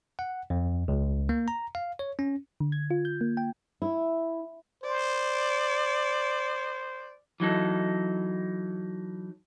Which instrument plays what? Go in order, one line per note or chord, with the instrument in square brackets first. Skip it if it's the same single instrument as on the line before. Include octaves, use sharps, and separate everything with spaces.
[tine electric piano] F#5
F2
C#2
A#3
A#5
F5
C#5
C#4
[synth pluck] D3
G#6
F4
G6
A#3
G5
[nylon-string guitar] E4
[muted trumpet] C5 [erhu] D5
[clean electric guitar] E3 F#3 D#4 A4